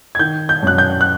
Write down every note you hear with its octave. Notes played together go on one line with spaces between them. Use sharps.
G#6
D#3 G6
G6
F#2 F#6
G6
F#6